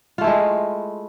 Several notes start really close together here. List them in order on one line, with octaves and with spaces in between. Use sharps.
F4 A3 E4 G#3